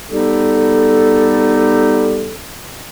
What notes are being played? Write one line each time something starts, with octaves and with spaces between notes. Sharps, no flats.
G3 B3 D#4 G4 A4